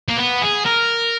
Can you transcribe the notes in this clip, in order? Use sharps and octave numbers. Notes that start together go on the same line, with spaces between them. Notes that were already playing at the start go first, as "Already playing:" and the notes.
A#3
B3
G#4
A#4